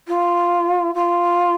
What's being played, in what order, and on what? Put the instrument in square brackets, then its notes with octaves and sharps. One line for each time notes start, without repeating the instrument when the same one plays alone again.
[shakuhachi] F4
F4